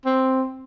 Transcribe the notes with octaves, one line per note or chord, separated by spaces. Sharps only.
C4